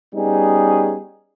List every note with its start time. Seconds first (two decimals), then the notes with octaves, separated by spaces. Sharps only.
0.15 G3 B3 C#4 D#4 G#4